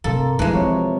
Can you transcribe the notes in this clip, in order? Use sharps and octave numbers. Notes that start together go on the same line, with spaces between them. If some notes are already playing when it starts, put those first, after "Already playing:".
G2 C3 A#3 A4 C6
D#2 E3 F3 G#3 A#4 A5
C3 F3 F4 C#5